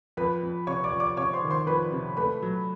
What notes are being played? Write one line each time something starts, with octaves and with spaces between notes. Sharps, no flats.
F2 B4 B5
F2
C3 C#5 C#6
D5 D6
F2
D5 D6
C3 C#5 C#6
C5 C6
D#3
C5 C6
F2 B4 B5
C3
A3 B4 B5
F#3